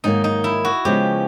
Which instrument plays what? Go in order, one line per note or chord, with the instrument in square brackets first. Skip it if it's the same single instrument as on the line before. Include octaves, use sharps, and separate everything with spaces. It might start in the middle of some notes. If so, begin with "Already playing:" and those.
[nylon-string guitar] G#2 D#3 F#3 A#3 [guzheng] D#4
[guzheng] D#4
E4
F#4
[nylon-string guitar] C#3 F3 G#3 B3 [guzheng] G4